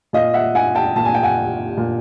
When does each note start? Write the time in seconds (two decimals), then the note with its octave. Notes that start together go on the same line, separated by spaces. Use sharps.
0.13 A#2 D#5 F5
0.34 E5 F#5
0.55 F#5 G#5
0.75 G5 A5
0.96 A#2 A5
1.05 G#5
1.14 G5
1.23 F#5 G#5
1.77 A#2